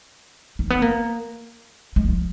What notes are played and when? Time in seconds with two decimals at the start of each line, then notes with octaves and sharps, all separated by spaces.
0.59 A#3
0.70 B3
0.82 A#3
1.96 G#3
2.09 F3